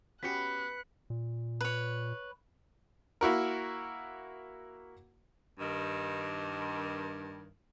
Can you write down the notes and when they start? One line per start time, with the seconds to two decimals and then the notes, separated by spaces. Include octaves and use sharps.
0.23 B3 C#4 F#4 G4 F#6 B6 C#7
1.10 A#2
1.61 B4 C#5
3.21 A#3 E4 F#4 A#4
5.60 G2 D#3